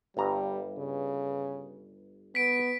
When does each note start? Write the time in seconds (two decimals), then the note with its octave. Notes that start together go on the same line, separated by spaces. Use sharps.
0.17 G1 G2 G3 A#5
0.78 C#3
2.35 B3 B6 D7